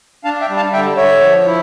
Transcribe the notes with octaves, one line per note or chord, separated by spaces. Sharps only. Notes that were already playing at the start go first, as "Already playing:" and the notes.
D4 F5 A5
E5 G5
G3
F5 A5
D3 E5 G5
D3 C#5 E5
F3
E4